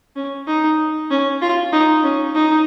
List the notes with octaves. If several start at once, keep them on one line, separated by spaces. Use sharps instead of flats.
C#4
D#4
C#4
F4
D#4
C#4
D#4